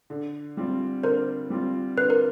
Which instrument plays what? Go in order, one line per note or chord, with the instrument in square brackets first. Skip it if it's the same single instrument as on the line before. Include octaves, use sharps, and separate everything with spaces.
[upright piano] D3
G3 C4 F4
[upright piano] D3 [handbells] A#4 C5
[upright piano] G3 C4 F4
[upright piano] D3 [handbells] B4
[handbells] A#4